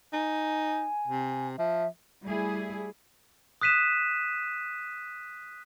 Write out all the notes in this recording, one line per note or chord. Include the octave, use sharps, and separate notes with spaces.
D#4 G#5
C3
F3 E5
G3 A3 E4 G#4
D#6 F#6 B6 D#7 E7